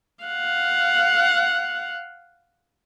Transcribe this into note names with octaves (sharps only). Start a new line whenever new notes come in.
F5 F#5